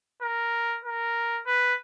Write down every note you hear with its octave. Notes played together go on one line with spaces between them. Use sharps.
A#4
A#4
B4